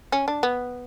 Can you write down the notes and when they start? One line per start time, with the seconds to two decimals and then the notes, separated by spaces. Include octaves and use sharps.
0.12 C#4
0.28 D4
0.43 B3